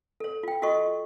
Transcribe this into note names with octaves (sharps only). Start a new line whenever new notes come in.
A4 C#5
F4 G5
F4 F#4 A4 D#5 C#6